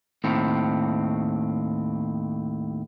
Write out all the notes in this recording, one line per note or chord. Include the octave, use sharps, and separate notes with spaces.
D#2 A2 C4